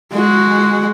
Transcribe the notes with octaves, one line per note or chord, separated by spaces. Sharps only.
G#3 F#4